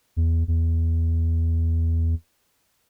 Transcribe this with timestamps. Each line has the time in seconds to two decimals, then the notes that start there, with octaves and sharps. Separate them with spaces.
0.16 E2
0.48 E2